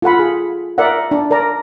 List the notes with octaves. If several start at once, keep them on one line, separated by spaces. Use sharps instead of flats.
F4 A4 F#5 B5
G#4
A#4 D5 E5 F#5
D4
A#4 D5 A#5